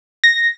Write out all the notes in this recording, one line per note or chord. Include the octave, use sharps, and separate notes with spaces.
A#6